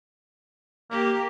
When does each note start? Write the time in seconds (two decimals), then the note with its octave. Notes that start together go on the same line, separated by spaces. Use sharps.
0.91 A#3 G4